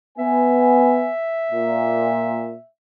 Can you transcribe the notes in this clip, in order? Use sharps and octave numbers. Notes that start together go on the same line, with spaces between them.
B3 E5 G#5
A#2